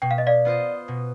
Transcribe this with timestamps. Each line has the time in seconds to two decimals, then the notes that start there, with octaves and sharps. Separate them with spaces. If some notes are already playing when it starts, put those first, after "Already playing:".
0.02 B2 G5
0.11 F5
0.18 D#5
0.27 D5 F5
0.45 B3 F4 C5 D#5
0.88 B2